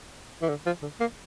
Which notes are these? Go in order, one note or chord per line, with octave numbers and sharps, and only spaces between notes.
E3
D3
F3
D3
A#3